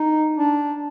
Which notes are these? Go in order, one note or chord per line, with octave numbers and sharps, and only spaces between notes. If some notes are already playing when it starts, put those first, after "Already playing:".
Already playing: D#4
D4